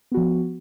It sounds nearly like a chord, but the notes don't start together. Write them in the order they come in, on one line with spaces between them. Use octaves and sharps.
B3 F#4 F3